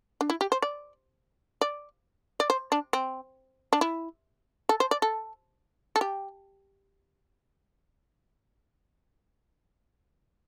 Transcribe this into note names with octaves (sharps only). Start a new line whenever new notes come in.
D4
E4
G4
C5
D5
D5
D5
C5
D4
C4
D4
E4
A4
C5
D5
A4
A4
G4